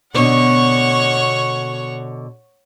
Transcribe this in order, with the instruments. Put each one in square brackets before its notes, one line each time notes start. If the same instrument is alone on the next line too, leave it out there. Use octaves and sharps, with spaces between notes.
[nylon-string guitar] B2 D3 [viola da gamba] C#5 [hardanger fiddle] F#5 C#6